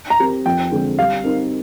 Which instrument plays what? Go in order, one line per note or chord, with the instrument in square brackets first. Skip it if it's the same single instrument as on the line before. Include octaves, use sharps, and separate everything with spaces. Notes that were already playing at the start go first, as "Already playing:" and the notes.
[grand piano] A#5
[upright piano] C4 G4 A#4
[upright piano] F2 [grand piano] G5
[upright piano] D3 G#3 C4
[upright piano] G3 [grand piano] F5
[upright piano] C4 D#4 A#4